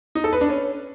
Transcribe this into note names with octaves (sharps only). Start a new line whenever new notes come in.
D#4
A4
B4
D4
C#4